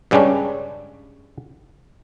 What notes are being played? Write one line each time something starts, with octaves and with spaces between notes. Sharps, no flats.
G2 C#3 G3 G#3 C#4 D4